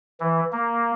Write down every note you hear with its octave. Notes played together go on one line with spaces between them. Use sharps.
E3
A#3